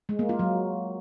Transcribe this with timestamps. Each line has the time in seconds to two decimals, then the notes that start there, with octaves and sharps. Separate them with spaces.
0.09 G#3
0.19 A#3
0.29 F4
0.39 F#3